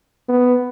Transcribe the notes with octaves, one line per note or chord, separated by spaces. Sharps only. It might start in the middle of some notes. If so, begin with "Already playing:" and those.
B3